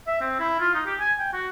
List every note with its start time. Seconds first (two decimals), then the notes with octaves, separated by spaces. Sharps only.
0.07 E5
0.21 C4
0.39 E4
0.60 F4
0.74 D#4
0.86 G4
1.00 G#5
1.19 G5
1.33 F#4